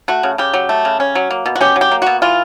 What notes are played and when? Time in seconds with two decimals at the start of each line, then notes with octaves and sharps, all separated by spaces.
0.08 A3 F#4
0.23 C#3
0.38 C#3 G4
0.54 F#3
0.69 A3
0.85 C#3
1.00 C#4
1.15 F#3
1.31 A#3
1.46 B2
1.55 F#4
1.61 C#4 G4
1.76 F#3
1.81 G4
1.91 A#3
2.02 B2 F#4
2.22 E3 F4